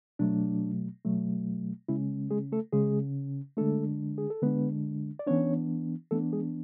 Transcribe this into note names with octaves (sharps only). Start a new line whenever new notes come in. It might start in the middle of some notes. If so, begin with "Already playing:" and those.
B2 F#3 A3 D4
B2 F#3 A3
C#3 G#3 C#4 E4
G#3 G#4
A3 A4
C#3 G#3 C#4 G#4
D3 G#3 A3 D4 A4
G#4
A4
D3 G#3 B3 D4 B4
D5
E3 B3 C#4 D4 C#5
E3 A3 B3 D4 A4
G#3 G#4